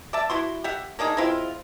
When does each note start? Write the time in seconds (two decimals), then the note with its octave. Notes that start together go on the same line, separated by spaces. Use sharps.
0.13 D5 E5 A5
0.30 E4 F#4 C6
0.64 G4 E5 F#5
0.99 A#3 D4 D#4 G#4
1.17 G#3 C4 E4 F4